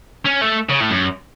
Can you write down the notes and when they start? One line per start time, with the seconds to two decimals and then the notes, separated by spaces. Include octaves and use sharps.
0.25 C#4
0.41 A3
0.69 C#3
0.80 A2
0.90 F#2